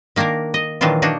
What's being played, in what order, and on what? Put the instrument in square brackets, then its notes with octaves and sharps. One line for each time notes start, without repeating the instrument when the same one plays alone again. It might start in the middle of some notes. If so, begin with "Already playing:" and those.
[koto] D#3 A#3 D4 F4 A#4
D#5
A#2 D#3 E3 F#3 D4 F4
A#3 D4 D#4 F#4